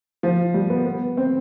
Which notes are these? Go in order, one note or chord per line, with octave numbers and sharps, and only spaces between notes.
F3
G3
B3
B3
C4